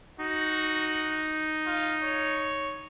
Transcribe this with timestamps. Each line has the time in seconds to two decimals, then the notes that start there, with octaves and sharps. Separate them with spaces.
0.20 D#4 F#4
1.66 F4
2.03 C#5